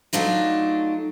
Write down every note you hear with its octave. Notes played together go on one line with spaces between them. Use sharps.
F#3 A3 D4 D#4 F4